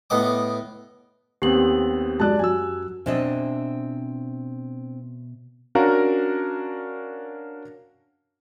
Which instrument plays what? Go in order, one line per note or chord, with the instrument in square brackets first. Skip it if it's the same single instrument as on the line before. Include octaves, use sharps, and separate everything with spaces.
[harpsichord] A2 B3 D#5 D6
[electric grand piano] D#2 B3 C4 [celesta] G4 F#7
[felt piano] F#2 G#3 F#6 [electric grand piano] D5 A5
[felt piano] F#2 F#3 [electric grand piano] G#5 E6
[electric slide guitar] B2 E5 G#5 [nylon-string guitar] C4 D4 D#5
[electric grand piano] C#4 D4 F#4 A#4 F5 A#5